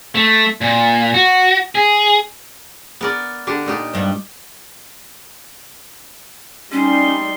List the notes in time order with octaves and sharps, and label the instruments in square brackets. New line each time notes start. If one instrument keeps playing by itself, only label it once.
[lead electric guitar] A3
A#2
F#4
G#4
[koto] B3 A#4 D5
D3 D4 G4
A#2 D#4 G4
[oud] G2 G3 B3
[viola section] G3 D#4 C6 [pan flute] C#4